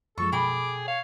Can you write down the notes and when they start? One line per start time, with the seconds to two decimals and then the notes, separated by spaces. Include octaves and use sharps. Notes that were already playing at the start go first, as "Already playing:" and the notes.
0.18 F#2 F3 G#3 A4 C#6
0.32 B2 G#4 A4 G5 B5 D6
0.87 C#5 F5